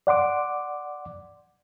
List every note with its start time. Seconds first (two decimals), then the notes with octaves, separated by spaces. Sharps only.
0.07 D5 F#5 C6 D6